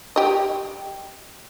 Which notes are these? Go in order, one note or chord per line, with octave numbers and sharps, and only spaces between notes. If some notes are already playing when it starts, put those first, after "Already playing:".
G4 D#5